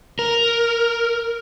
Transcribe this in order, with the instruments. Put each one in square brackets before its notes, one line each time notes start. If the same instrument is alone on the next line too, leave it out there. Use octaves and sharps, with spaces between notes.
[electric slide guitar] A#4